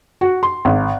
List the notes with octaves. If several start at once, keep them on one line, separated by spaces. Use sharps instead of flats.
F#4
C6
G#1